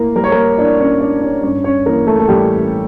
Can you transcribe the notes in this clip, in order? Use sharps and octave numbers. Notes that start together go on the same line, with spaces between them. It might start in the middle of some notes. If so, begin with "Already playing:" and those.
Already playing: A2 A#3 A#4
G3 A#4
C#5
A#3 A#4
A2 D4 D5
C#4 C#5
A2 D4 D5
C#4 C#5
G2 C#4 C#5
C#4 C#5
E3 A#3 A#4
A3 A4
A4
A1 G3 G4